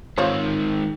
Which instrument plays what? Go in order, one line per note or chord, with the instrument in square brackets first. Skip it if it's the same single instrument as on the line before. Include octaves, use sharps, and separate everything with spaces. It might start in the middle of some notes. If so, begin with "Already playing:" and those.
[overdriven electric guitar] G#2 C4 [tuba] D#3 [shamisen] F4 C5 C#5